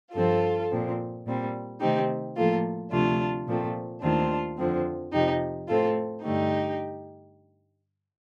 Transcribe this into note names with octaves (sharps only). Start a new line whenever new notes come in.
G2 F3 C4 F4 A4
A#2 F3 C4
A#2 G3 C4
C3 D#3 A3 C4 D#4 G4
A2 F3 A#3 F4 A4
D2 C3 F3 A3 D4 F4
A#2 F3 A3 C4
D#2 D#3 A3 C4 D4 F4
F2 D3 F3 C4
F2 C3 F3 D#4 G4
A2 A3 C4 F4 A4
G2 D3 A3 D#4 G4